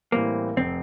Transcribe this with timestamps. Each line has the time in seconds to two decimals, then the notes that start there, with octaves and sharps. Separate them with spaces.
0.12 A2 E3 G3 A#3 C4
0.57 F1 C4